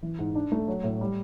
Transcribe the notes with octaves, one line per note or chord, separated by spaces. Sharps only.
E3
G#2
D4
A3
F#3
A2
G3